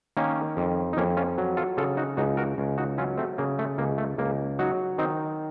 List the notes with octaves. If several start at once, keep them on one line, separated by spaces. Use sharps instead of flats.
D#3 A#3 C#4
F2
D#4
F2 A#3 C#4
C#4 F4
F#3
F4 A4
C#3 F4 A4
D#4 F#4
C#2 D#4 F#4
F#4 A#4
C#2
D#4 F#4
F#3 C#4 F4
A3 C4
C#3 A#3
A3
C#2 A#3
A3
C#2 A#3
F#3 D#4 F#4
D#3 C4 D#4